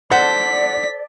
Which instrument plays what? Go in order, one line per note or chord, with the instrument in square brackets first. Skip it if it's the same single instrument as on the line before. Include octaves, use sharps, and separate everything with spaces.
[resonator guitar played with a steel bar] A4 C5 [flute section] D5 [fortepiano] F#5 [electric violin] B6